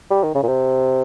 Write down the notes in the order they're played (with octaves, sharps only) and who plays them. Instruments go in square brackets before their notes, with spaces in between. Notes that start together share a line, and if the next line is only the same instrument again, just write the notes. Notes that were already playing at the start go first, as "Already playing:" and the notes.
[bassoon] G3
D#3
C#3
A#2
C3